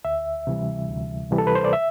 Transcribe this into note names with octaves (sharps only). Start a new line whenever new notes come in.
D2 E5
C3 E3 G3
D2
C3 E3 G3
A4
B4
C5
D5
E5